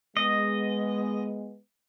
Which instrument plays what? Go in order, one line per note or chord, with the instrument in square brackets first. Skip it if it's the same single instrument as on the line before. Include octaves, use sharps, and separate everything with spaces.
[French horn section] G#3 B3 [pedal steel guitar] D#5